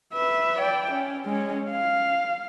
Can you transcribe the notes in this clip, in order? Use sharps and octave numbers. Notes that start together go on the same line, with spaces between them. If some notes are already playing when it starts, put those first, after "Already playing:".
B4 E5
D5 G5
C#4
G#3 C#4
F5